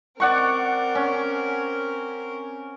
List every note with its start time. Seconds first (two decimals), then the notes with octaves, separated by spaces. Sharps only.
0.20 C4 A#4 D5 F#5 C#6
0.95 C#4